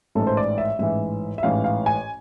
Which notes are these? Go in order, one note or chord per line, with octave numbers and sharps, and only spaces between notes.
A1 G#2 E3 A4
C5
D5
E5
A1 G#2 E3 E5
E5
A1 G#2 E3 F5
F5
G#5